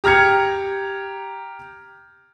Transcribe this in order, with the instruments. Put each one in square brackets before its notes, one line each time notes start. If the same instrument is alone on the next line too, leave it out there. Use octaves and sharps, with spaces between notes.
[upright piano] G4 A#5 F6 G#6 C#7